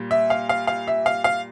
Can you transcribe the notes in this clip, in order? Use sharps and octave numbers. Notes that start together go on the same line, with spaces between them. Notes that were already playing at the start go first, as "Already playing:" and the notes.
Already playing: A#2 G3
E5
F5
F5
F5
E5
F5
F5